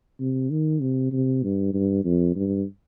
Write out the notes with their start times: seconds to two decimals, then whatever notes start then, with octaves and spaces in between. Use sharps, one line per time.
0.20 C3
0.50 D#3
0.81 C3
1.12 C3
1.43 G2
1.73 G2
2.04 F2
2.35 G2